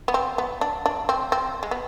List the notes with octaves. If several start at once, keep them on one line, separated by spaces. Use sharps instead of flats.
B3
C4
B3
D4
D4
C4
C4
G#3
B3